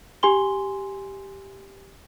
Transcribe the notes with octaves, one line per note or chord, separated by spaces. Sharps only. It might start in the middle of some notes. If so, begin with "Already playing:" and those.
G4 G#5 C6 G7